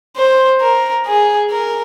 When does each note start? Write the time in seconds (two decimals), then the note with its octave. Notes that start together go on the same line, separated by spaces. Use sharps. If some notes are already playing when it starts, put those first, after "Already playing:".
0.17 C5
0.61 A#4
1.06 G#4
1.51 A#4